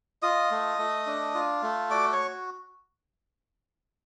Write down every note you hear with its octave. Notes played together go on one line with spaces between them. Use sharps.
F4 D#5 D#6
A3
A3
D4
F4
A3
F#4 D5 D6
C#5 C#6